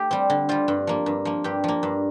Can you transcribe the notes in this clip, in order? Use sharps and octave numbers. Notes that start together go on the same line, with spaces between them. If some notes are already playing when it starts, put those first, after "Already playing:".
Already playing: A3 G4
G3 C4
D3
G3 C4 F4
G2
F3 A#3
G2
F3 A#3
G2 G4
F3 A#3
G2